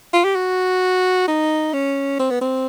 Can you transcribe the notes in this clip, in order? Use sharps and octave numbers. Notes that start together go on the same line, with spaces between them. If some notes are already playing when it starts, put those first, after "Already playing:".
F4
G4
F#4
D#4
C#4
C4
B3
C4